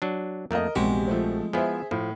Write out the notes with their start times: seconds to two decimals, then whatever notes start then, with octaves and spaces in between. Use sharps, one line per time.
0.02 F#3 D4
0.51 F2 A3 A#3 A#4 D#5
0.76 A#1 E2 C3 G#3 F#4 G4
1.07 F3 A3 C4
1.53 F3 B3 E4 G#4 C5 E5
1.91 A2 F3